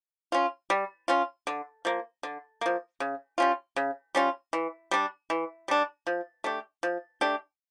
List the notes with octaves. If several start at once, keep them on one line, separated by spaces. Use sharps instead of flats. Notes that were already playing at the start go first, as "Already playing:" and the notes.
C#4 F4
G3
C#4 F4
D3
F3 A#3
D3
F3 A#3
C#3
G3 C#4 F4
C#3
G3 C#4 F4
E3
G3 D4
E3
G3 D4
F3
A3 D4 G4
F3
A3 D4 G4